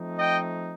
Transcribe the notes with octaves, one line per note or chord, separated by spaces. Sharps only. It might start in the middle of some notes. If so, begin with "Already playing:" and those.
Already playing: F3 A3 C4 D#4
D#5 G5